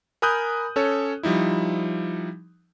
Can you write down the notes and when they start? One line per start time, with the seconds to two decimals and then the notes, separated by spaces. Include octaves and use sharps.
0.22 A#4 G#5 B5 D#6 F#6 G6
0.76 C#4 A4 C#5
1.23 F3 G3 D#4 E4